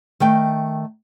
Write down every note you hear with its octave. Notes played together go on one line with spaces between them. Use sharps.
D#3 A3 G5